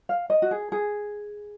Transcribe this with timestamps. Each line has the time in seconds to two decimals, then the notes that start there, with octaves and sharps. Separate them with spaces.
0.09 F5
0.30 D#5
0.42 F#4
0.51 G#4
0.72 G#4